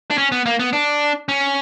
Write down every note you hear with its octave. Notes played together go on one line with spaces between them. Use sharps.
D4
C#4
B3
A#3
B3
D4
C#4